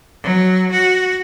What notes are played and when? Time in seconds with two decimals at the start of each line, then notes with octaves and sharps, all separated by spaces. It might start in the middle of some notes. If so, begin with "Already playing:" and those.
0.22 F#3
0.71 F#4